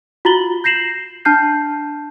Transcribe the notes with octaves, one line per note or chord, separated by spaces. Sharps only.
F4 F#4 A#5 A6 F#7 G7
G6 A#6 C7 E7 F#7
D4 A5 F6 G6 C7